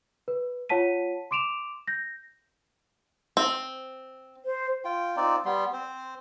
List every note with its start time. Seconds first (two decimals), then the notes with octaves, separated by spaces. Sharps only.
0.28 B4
0.69 F4 C#5 F#5 A5 B6 D#7
1.31 C6 D6 D7 E7 F7
1.87 G6 A#6
3.37 C4
4.45 C5
4.85 F4 G5
5.17 C4 D#4 F4 D5
5.45 G3 B3 C6
5.73 C4 C5